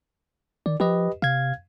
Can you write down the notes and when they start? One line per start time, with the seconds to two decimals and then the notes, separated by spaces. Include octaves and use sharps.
0.66 D#3 D5
0.80 F3 G4 B4 D#5
1.22 C3 F5 G#6